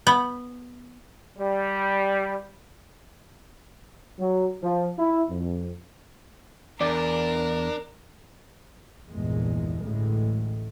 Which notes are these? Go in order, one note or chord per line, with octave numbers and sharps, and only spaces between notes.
B3
G3
F#3
F3
E4
F2
E2 D4 A#4 D5
A#1 E2 G2 A#2 G#3
A1 D2 A2 G#3